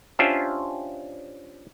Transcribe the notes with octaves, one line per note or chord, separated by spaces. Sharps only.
C#4 D4 F4 G4 C5 E5